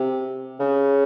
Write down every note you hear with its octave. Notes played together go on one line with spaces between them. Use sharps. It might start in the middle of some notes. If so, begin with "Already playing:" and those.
Already playing: C3
C#3